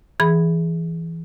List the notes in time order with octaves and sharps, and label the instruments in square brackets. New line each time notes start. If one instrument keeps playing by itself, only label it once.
[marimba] E3 G#4 B5